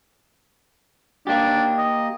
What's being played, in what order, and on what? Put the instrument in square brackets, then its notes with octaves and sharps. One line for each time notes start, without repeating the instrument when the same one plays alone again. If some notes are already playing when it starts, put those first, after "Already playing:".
[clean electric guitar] A#3 G4 [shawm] D4
[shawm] D#5